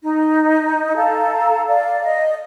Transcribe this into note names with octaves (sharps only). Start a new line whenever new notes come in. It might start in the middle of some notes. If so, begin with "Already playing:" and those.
D#4
A4 F5 A5 A#5
D5 F5
D#5